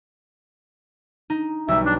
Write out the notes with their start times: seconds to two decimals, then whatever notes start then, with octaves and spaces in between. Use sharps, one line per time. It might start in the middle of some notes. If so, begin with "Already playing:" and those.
1.30 D#4
1.68 B1 G3 E5
1.85 D4